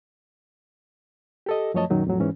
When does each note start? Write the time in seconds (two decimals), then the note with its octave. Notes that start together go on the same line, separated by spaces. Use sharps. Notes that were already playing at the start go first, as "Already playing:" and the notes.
1.46 G4 A4 D#5
1.74 F#2 F3 A3 C#5 D#5 A5
1.90 F#2 A#2 D#3 F#3 D#4
2.07 F2 A2 F#3
2.20 G#2 E3 C#4